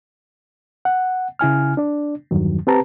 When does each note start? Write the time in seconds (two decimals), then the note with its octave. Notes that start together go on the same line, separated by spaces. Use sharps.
0.85 F#5
1.39 C#3 E4 G#5 F6
1.77 D4 D5
2.31 E2 G2 D#3 F#3
2.67 C4 G4 B4 A5 A#5